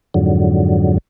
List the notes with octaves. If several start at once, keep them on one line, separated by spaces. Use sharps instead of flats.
F2 G#2 D3 F#3